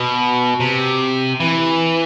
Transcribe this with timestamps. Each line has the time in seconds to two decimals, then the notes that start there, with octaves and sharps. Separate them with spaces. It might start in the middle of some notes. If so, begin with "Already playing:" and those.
Already playing: B2
0.60 C3
1.40 E3